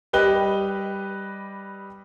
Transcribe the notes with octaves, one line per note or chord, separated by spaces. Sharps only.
G3 G4 B4 D#5 F#6 G7